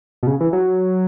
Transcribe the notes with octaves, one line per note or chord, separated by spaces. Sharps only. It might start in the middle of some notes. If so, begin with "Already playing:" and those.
B2
C#3
E3
F#3